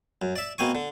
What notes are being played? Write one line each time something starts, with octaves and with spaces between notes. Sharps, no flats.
F#2
D5 E5
B2 A#3 C4 G#5 C#6
D3